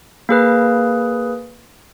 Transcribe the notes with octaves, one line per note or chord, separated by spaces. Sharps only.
A#3 G#4 B4